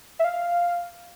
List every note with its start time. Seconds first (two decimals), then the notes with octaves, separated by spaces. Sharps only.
0.19 E5
0.24 F5